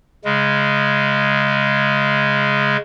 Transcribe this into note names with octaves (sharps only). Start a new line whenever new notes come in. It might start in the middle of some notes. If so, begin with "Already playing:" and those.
C#3 G#3